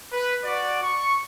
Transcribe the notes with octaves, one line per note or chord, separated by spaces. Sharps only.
B4
F#4 D5
C#6